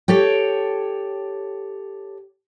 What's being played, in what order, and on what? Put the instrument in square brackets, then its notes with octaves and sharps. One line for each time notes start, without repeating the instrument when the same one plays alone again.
[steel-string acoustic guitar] G4 A4 C#5 G5